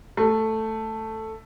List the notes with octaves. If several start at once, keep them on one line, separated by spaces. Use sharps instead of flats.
A3